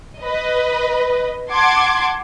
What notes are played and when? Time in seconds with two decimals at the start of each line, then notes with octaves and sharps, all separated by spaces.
0.20 B4 D#5
1.51 F#5 A5 C6 D6 G#6